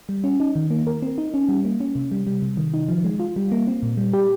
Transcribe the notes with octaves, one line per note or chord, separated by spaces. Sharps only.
G3
C#4
D#4
D#3
A#3
A#4
C4
D#4
C#4
G3
A#3
C#4
C3
G3
G3
C3
D#3
D#4
F3
G#3
F4
G3
A#3
C4
A#2
G3
G4